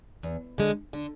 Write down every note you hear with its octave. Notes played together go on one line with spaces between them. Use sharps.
E2
D3 G#3
D3